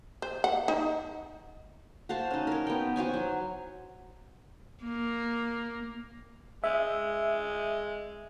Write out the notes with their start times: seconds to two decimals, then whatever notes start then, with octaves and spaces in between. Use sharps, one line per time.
0.22 C5
0.44 F#5
0.68 D#4
2.09 F#4 C5 F5 A5
2.30 C#4 D#4
2.47 A#4 C#5
2.67 B3 G5
2.96 F#4 C5 C#5 G#5
3.14 F#3
4.84 A#3
6.64 G#3 E5